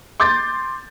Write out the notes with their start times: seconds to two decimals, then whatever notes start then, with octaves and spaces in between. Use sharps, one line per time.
0.20 C6 D6 G6 A6